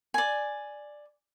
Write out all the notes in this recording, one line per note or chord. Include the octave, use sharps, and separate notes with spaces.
D5 G#5